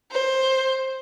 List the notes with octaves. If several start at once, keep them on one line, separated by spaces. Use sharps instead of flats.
C5